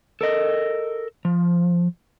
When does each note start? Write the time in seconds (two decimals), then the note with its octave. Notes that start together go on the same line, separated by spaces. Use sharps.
0.21 A4 A#4 D#5
1.25 F3